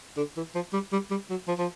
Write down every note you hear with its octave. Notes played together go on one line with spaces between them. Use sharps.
D3
E3
F3
G3
G3
G3
F#3
F3
F3